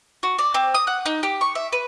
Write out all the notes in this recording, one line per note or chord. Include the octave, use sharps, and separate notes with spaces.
F#4
D5
C4
D#6
F#5
D#4
G4
C#6
E5
B4